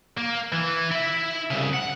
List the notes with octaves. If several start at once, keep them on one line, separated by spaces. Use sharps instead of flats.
A#3
E3
E4 E5
C2 C#3
F#5